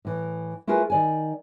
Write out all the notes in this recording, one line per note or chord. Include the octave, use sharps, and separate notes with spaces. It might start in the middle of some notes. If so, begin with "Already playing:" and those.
A2 E3
A3 E4 F4 G#4 A#4 B4
D#3 D5 G#5